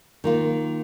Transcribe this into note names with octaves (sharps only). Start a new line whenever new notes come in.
D#3 A#3 F4